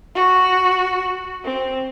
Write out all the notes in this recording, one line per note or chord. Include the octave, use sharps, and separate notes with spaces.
F#4
C4